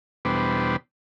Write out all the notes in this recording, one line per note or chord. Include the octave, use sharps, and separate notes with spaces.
E2 B2 G3 B3 D4 C5